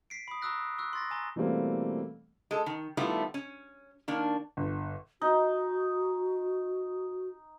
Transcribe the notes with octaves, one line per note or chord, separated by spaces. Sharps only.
B6 C7 D7
B5 D#6
A#5 C#6 D#6 E6 F#6 A#6
C#6 E6 F#6
C6 A6 A#6
G#5 A#5 C6 G7
B2 E3 G3 A3 A#3 C4
G#3 A4
D#3
D#3 G3 A3 B3 E4 F4
C#4
D#3 A#3 D4
G1
D#4 F#4